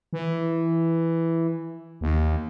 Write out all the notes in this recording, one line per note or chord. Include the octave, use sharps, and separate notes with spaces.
E3
D#2